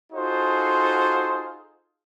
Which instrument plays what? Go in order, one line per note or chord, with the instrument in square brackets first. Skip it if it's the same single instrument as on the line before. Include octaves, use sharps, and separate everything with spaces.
[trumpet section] D#4 F4 F#4 G#4 A4 C5